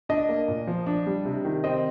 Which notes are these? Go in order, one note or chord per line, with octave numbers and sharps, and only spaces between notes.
D4 D#5
A#3
A#2
F3
D4
G3
C3
D#3
C4 D#5